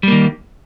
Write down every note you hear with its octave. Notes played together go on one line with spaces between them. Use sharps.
D#3 G3 A#3